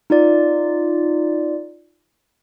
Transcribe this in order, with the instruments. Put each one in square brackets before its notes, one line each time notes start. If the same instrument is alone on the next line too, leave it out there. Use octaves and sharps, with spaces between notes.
[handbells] D#4 F4 D5